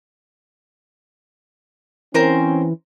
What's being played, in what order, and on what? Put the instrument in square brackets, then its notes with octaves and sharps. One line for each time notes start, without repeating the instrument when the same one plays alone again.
[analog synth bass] E3 [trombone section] C4 C#4 [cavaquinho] A#4 C5 C6